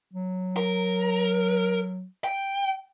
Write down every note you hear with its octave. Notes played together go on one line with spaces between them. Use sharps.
F#3
A#4
G5